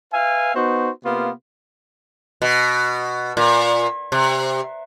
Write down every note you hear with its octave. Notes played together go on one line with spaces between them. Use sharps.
B4 E5 F5 G#5
B3 D#4 F#4 C5
C3 A#3 B3 F4
B2
A#2
C3